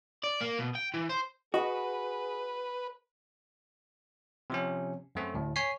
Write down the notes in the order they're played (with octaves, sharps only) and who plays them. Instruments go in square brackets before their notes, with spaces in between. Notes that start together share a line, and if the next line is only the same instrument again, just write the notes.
[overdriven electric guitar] D5
A#3
B2
G5
E3
C5
[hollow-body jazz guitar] F#4 [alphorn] G#4 [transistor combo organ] B4 [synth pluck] D#5
[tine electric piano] C3 F3 C#4
F#2 A3 C4
D2 A2
C#5 G#5 B6 C7